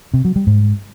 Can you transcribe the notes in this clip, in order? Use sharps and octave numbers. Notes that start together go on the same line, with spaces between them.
C3
F#3
G3
G#2